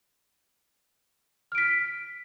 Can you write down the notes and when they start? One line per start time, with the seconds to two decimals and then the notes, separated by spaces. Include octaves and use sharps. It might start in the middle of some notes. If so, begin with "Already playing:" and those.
1.52 F6
1.55 D7
1.58 B6